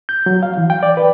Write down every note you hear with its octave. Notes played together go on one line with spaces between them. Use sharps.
G6
F#3
F5
E3
G5
D5
B4